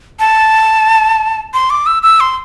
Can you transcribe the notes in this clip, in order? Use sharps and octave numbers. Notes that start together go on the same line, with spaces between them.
A5
C6
D6
E6
E6
C6